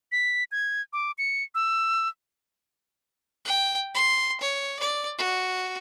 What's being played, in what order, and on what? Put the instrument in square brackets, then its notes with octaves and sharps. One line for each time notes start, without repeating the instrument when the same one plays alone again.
[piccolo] B6
G#6
D6
C#7
E6
[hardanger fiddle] G5
C6
C#5
D5
F#4